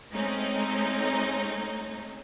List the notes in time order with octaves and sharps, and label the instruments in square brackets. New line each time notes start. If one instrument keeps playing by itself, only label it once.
[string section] G#3 A3 C4 C#4 D#4 D#5